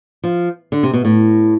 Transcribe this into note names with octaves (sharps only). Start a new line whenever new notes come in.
F3
D3
C3
B2
A2